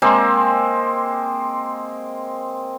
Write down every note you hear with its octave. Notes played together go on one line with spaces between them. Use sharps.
G#3 A#3 C4